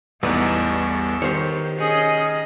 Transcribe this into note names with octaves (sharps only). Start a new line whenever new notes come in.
A1 E2 A2 G3 B3 D#4 A4
D#3 G4 C5 C#5
C#4 G#4 D#5